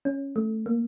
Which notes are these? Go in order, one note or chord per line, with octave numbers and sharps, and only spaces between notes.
C#4
A3
A#3